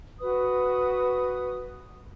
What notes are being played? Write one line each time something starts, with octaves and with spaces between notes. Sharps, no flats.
F#4 B4 D#6